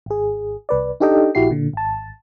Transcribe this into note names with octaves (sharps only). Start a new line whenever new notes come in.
G#1 G#4
C2 B4 D5
D4 D#4 G4 A4 D#5 G5
A#1 E4 F#4 G4 C7
A#2 D3
G#1 A5